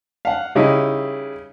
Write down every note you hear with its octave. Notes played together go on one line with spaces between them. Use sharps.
F5 F#5
C#3 G3 D#4 E4